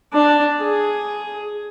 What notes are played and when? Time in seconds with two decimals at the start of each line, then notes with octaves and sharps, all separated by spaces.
0.13 D4
0.61 G#4